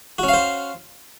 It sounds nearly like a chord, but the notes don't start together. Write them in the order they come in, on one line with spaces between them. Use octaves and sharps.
F#4 C#4 F5 C5